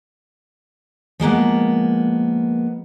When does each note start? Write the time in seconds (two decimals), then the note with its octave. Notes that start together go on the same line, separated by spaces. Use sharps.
1.20 F3 G#3 A#3 B3